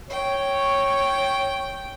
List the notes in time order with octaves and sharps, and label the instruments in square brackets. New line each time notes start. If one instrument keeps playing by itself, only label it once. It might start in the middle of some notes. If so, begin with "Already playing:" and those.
[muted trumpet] C#5 [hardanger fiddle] G5